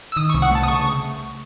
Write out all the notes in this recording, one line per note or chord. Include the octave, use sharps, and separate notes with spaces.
E6
D#3 D#6
C2 C#6
F#5
A3 A5
D#6
C#3 C#6